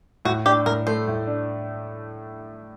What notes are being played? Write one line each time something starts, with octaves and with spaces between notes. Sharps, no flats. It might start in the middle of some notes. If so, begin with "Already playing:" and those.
A2 F#4
D4 G4
A2 A#4
A3 C5
A2
D4